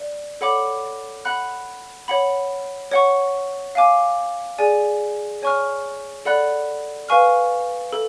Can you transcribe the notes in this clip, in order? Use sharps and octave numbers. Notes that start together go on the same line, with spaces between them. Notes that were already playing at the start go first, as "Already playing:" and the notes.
Already playing: D5
A4 C#5 F#5 B5 D6
F#5 B5 F#6
C#5 F#5 B5
C#5 F#5 C#6
F5 G#5 D6
G#4 D5 G#5
C#5 G#5 C#6 F6
A4 D5 F#5 B5 F#6
B4 F5 G#5 C#6 F6
A4